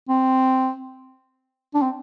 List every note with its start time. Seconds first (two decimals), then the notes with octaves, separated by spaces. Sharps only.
0.09 C4
1.74 D4
1.82 C4